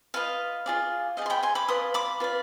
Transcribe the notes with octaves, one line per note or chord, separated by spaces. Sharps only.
F4 B4 D#5 F5
F4 G#4 D5
F4 G#4 D5 D#5 G5
C6
G5 B5
G#5 C6
B5 D6
F4 B4 D5 C6 D#6
B5 D6
F4 B4 D5